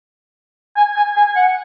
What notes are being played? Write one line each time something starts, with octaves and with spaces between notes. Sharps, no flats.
G#5
G#5
G#5
F#5